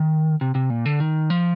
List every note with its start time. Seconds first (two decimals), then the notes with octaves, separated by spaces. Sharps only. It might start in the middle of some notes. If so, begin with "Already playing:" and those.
Already playing: D#3
0.41 C3
0.55 C3
0.70 A#2
0.85 D3
1.00 D#3
1.30 F3